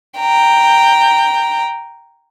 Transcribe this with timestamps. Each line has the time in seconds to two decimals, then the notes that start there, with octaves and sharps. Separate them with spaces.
0.18 G5 A#5